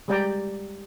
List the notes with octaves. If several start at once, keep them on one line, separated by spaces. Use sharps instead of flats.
G3 G#3 G4 D5 G5 A#5